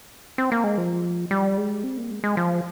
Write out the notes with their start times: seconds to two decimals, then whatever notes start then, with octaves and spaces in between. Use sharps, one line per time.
0.38 C4
0.52 A#3
0.64 G#3
0.78 F3
1.31 G3
1.57 G#3
1.84 C4
1.98 A#3
2.11 G#3
2.24 G#3
2.37 F3